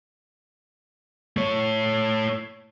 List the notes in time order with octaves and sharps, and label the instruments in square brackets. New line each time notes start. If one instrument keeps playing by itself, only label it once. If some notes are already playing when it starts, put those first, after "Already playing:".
[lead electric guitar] A3 C#5